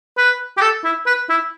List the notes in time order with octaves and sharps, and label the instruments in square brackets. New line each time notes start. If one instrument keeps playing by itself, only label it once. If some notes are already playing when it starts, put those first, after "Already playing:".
[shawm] B4
G4
A4
E4
B4
E4